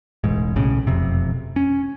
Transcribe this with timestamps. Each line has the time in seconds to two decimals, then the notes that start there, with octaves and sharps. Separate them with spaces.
0.24 E1 A1 G#2
0.56 B1 A2 C#3
0.87 E1 F2 C3
1.56 C#4